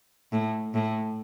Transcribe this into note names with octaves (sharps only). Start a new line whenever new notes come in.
A2
A2